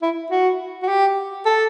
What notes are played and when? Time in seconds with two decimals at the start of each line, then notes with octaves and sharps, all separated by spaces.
0.02 E4
0.31 F#4
0.83 F#4
0.88 G4
1.46 A4